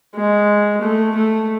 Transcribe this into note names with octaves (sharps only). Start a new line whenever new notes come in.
G#3
A3
A3